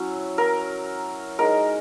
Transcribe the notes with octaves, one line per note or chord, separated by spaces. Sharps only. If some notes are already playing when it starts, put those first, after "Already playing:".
Already playing: F#3 C#4 E4
A#4
G#3 D#4 A#4